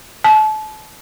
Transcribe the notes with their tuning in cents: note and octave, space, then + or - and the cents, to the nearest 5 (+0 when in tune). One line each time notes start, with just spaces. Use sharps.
A5 -30